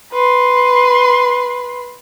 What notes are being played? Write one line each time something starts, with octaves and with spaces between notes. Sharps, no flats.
B4 C6